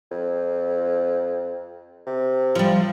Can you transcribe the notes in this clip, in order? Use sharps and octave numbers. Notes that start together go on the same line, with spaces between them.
F2
C3
F3 G3